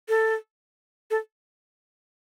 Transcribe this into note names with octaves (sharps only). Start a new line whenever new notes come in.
A4
A4